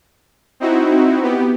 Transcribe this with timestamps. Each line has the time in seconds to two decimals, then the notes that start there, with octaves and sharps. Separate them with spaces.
0.60 C4 D#4 E4 F#4
1.23 B3 G4